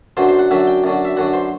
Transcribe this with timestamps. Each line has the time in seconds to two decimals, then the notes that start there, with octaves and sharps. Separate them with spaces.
0.17 F#2 D3 F#3 C5
0.29 C5
0.39 F#5
0.51 F#2 D3 F#3 E5
0.67 G5
0.84 F#2 D3 F#3
1.05 E5
1.17 F#2 D3 F#3 F#5
1.33 C5